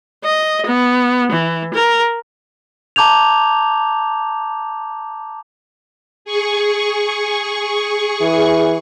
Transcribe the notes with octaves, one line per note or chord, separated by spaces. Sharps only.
D#5
B3
E3
A#4
A5 A#5 D6 G6 G#6 F7
G#4 C#6
E3